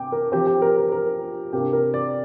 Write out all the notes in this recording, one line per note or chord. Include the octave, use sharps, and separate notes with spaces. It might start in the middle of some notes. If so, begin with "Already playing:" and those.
Already playing: C3 G5 D6
A#4
F3 C4 G4
G4
A#4
A#4
A#4
C3 A#3 D4 G4
A#4
D5